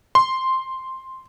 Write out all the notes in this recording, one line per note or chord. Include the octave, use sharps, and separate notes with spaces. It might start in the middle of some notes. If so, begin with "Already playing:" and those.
C6